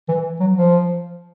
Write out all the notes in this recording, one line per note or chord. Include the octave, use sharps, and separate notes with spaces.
E3
F#3
F3